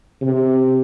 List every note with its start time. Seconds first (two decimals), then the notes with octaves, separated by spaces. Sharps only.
0.22 C3